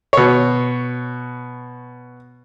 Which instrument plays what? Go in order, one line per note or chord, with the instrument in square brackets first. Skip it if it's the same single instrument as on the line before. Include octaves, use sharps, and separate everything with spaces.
[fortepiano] B2 C#5